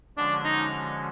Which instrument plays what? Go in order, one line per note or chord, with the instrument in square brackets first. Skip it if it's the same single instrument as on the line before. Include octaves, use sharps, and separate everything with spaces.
[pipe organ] D3 F3 G#3 C#4 F#4 [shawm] D4
[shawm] D#4